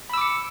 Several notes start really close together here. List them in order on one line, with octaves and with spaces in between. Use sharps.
B5 E6 D6 C#7